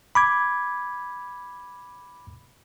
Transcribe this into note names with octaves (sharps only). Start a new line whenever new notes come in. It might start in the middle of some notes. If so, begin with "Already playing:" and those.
B5 D6 G#6